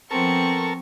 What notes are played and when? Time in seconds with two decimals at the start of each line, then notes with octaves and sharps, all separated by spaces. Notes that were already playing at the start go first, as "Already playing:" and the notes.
0.11 F3 B3 C4 A4 A#4 C#6